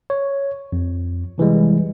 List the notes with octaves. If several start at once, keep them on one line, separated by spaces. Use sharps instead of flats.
C#5
F2
C3 E3 G3 G#3